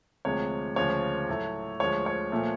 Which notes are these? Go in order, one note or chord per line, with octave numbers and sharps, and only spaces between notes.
D2 C3 F3 G#3 C#5
D2 C#3 F3 G#3 C#5
A2 F#3 A3
D2 D3 F3 G#3 C#5
C#5
A#2 F3 A3